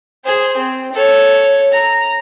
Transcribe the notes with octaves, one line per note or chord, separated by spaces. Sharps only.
G#4 C5
C4
A4 C#5
A#5